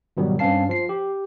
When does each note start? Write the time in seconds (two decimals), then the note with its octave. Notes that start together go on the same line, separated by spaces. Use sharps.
0.17 G#2 B2 D#3 F#3 G3
0.39 G2 C4 C#4 F5 A5 C7
0.69 F3 C7
0.89 G4